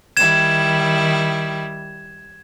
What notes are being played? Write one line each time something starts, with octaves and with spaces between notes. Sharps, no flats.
D#3 G3 E4 G#6 E7